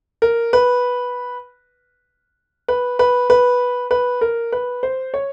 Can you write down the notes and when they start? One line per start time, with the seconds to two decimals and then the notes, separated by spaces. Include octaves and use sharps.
0.22 A#4
0.53 B4
2.68 B4
2.99 B4
3.30 B4
3.91 B4
4.21 A#4
4.52 B4
4.83 C5
5.14 C#5